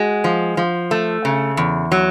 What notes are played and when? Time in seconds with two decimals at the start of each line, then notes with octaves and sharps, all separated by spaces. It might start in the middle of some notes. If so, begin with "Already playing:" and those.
Already playing: G#3 F#4
0.24 F3
0.57 F3
0.91 A3
1.25 C#3
1.57 E2
1.92 F#3